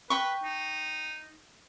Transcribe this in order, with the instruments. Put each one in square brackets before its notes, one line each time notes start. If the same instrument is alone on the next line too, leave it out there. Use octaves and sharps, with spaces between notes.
[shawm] B4 [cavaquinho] G5 C#6
[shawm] D#4